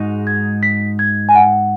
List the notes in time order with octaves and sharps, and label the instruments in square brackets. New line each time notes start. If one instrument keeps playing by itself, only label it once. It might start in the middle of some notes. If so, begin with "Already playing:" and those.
Already playing: [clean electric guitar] G#2 G#3 D#4 F#4
[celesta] G#6
B6
G#6
G#5
F#5